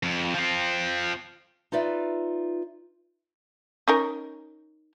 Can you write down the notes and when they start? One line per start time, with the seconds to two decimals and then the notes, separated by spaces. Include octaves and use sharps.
0.03 F2
0.34 F3 C4
1.72 D#4 F4 B4 D5 E5
3.88 C#4 D#4 A#4